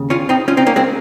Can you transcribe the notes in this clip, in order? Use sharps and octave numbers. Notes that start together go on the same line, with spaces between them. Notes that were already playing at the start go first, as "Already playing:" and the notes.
Already playing: D#2 C#3
C#4 F4
C4 D#4
C#4 F4
C4 D#4
A#3 C#4
G#3 C4